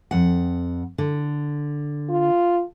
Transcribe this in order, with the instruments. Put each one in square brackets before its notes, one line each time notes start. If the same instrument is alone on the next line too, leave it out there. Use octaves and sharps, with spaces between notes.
[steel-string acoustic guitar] F2 F#5
D3
[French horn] F4